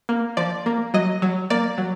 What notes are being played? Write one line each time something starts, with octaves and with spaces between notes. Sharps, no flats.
A#3
F3 D5
A#3
F#3 D#5
F#3
A#3 D5
F#3